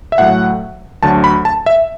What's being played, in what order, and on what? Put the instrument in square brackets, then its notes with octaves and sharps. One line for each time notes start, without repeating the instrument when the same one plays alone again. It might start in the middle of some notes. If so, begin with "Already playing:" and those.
[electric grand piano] E5
A2 F#3 A3 F#5
D2 D3 F#3 A3 A5
B5
A5
E5